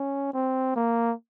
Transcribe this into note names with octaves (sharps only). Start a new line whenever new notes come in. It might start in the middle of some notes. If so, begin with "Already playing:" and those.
Already playing: C#4
C4
A#3